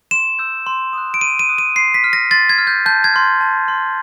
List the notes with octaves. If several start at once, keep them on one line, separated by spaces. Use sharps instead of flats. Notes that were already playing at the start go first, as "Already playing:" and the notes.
C6 E7
E6 G6
C6
D#6 F#6
D7
C6 D#7
D#7
D#6 F#6
D#7
C6 C7
B6
F6
A#6
C6 A6
G#6
F6
G6
A5 G6
G#6
C6 F6
A5
C6 F6